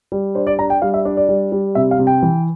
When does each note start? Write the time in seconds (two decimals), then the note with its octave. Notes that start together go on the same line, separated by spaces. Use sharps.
0.12 G3
0.35 D4 C5
0.47 D5
0.59 D4 A#5
0.70 G5
0.82 G3 F5
0.94 E5
1.05 D4 D5
1.17 D5
1.29 G3
1.52 G3
1.75 C3 E5
1.91 F5
1.99 C3
2.07 G5
2.23 E3